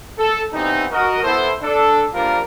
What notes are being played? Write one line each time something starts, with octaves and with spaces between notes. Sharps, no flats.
A4
E3 G3 B3 C4 D#4
F#4 A#4 D#5
B3 E4 A4 C5
D4 A4
F3 G3 A#3 D4 F4 A#4